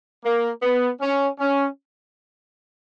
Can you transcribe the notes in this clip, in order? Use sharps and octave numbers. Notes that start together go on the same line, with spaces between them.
A#3
B3
C#4
C#4